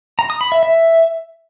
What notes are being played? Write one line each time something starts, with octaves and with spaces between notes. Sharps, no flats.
A#5
D#6
B5
E5
E5